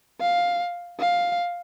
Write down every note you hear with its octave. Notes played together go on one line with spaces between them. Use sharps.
F5
F5